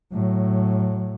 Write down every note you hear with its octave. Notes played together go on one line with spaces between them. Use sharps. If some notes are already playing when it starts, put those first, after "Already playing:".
A2 F#3